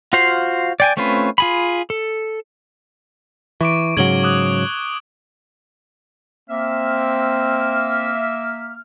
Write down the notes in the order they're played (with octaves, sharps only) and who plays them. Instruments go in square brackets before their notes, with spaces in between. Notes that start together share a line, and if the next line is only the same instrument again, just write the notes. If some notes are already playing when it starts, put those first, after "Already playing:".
[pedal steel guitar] F4 F#4 C5 F5
D5 G5 G#5
A3 C4 C#4 F4 B4
F4 G#4 B5
A4
[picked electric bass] E3 [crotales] C#6 D6 D7
[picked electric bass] G#2 C#3 F#3 [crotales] G#6 F#7 G7
[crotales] D6 D#6 F#6
[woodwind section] A#3 E5 F6 [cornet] C4